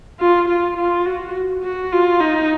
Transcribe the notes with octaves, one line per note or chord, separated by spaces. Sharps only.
F4
F4
F4
F#4
F#4
F4
D#4